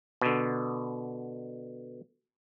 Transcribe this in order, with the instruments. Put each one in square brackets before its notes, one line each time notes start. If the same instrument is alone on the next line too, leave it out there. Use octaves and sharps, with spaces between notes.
[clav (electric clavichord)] B2 D3